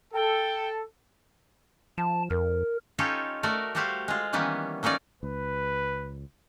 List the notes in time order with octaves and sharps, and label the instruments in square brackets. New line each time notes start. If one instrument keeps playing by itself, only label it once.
[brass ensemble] A4 [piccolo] G5
[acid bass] F3 [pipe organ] A5
[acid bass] F2 [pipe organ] A#4
[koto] C#4 D#4 F4 G4 A4 C#5
A3 F#4 A#4 D5
G3 A3 F#4 G4 C5 F5
G#3 F4
D#3 E3 G3 A#3 B3 C#4
F#3 A#3 C#4 D#4 D5
[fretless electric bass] C#2 [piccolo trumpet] B4